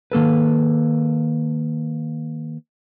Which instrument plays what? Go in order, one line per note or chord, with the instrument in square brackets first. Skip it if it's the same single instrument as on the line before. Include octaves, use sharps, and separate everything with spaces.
[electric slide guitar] D#3 A#3 A4 B4